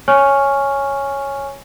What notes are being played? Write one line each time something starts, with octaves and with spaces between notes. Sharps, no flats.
C#5 G#5 C#6 F6